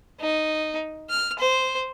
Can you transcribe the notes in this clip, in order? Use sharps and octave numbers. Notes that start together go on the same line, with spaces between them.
D#4
F6
C5